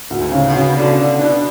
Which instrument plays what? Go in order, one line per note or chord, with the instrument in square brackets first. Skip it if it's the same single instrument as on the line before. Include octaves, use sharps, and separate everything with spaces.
[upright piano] D2
[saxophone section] G#2
[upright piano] C#3
[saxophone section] B2
[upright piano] C#3
[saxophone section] B2 D3 [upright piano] D4
[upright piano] D4
[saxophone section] B2 [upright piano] D4